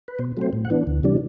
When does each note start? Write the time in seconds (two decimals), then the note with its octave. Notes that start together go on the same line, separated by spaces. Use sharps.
0.08 B4
0.19 B2 C5
0.37 F#3 A3 C4 C5
0.53 A2
0.65 F#5
0.70 E3 B3 D4
0.87 D2
1.03 C3 E3 G3 D4